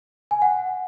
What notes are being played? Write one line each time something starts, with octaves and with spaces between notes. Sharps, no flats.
G#5
F#5